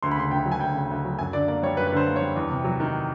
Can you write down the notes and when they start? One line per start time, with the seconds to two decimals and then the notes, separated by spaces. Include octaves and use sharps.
0.03 D2 C6
0.11 B5
0.17 C#3 C6
0.31 D2 G5
0.46 F#3
0.52 G#5
0.60 D2 G5
0.75 C#3
0.91 D2
1.05 F#3
1.19 F#2 G#5
1.33 D3 D5
1.48 A#3 D5
1.62 G3 C#5
1.77 F#2 B4
1.87 B4
1.93 D3 C5
2.07 A#3
2.16 C#5
2.21 G3
2.36 E2
2.50 C3
2.64 F#3
2.80 D#3